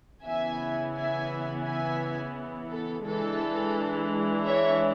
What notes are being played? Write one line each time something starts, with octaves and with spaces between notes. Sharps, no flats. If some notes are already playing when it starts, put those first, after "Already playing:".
C#3 E3 B3 E4 E5 G#5
E5 G#5
E5 G#5
A4
E3 G#3 D4 A4
C#5 E5